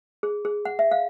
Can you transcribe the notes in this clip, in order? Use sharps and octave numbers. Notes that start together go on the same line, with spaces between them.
G#4
G#4
F#5
E5
F5